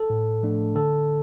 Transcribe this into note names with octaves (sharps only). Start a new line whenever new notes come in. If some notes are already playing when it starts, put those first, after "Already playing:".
Already playing: A4
A2
F3 A3 D4
D3 A4